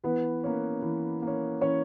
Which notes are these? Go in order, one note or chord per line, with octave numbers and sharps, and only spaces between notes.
E3 B3 B4
A#3 C#4
E3
A#3
C#4
E3 C#4 C#5